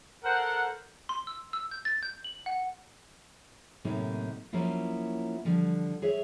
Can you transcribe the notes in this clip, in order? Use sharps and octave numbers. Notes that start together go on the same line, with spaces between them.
A4 A#4 C5 F#5
C6
E6
E6
G6
A6
G6
F#7
F#5
A2 C3 F#3 A#3 D#4 G4
F3 F#3 A#3 C#4 E4 F4
D3 F3 G3
G#4 C#5 E5